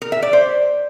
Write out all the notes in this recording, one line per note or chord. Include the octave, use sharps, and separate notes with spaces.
A#4
E5
D5
C5